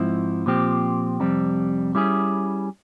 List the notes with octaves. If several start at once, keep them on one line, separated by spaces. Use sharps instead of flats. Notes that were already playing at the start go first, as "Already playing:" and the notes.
Already playing: G#2 F3 C4 E4
A#2 F3 C4 G4
F2 C3 G3 C4
G3 C#4 E4 G#4